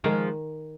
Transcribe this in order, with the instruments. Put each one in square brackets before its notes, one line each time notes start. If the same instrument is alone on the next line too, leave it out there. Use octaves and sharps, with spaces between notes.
[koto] D#3 [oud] F3 G#3